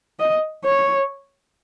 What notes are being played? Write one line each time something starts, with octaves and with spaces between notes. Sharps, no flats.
D#5
C#5